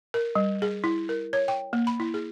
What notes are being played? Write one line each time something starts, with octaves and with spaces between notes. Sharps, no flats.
A#4
G3
G#4
E4
A#4
C#5
G5
A#3
B5
E4
G#4